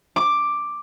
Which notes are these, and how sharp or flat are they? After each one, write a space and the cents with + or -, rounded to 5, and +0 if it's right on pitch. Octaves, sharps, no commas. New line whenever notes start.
D6 +5